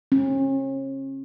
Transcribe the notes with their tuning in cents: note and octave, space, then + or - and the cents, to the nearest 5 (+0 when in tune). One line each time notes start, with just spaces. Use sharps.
C#4 -40